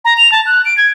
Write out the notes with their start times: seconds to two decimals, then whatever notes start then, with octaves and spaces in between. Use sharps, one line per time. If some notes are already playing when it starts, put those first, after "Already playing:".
0.05 A#5
0.17 F7
0.32 A5
0.46 F#6
0.65 D7
0.78 G#6